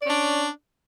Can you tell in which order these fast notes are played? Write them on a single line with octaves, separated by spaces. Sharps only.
D5 C#4 D4